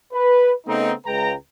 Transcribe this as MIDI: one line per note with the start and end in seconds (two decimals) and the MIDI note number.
0.13 0.52 71
0.67 0.92 49
0.67 0.92 57
0.67 0.92 59
0.67 0.92 60
0.67 0.92 63
1.06 1.33 37
1.06 1.33 56
1.06 1.33 71
1.06 1.33 79
1.06 1.33 82